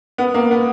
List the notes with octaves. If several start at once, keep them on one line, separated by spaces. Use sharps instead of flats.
B3
A#3
B3